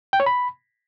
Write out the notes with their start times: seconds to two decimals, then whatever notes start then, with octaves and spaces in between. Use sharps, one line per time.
0.13 G5
0.20 C#5
0.26 B5